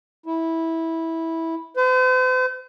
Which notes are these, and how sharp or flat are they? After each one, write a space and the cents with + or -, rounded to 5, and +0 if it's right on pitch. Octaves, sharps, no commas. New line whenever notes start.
E4 -15
C5 -45